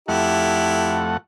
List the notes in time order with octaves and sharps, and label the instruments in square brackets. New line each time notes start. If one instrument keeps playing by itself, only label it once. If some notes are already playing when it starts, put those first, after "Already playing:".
[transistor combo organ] F2 A3 F#5 [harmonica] E4 G4